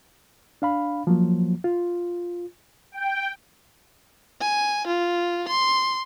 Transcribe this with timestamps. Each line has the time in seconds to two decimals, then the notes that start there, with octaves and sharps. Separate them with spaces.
0.62 D4 F5 B5
1.07 F3 F#3 A#3
1.64 F4
2.92 G5
4.41 G#5
4.87 F4
5.48 C6